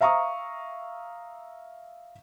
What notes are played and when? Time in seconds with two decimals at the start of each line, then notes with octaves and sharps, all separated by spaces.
0.01 E5 F5 A#5 C#6 D#6